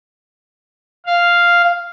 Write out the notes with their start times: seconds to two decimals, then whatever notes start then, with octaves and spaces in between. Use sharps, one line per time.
1.06 F5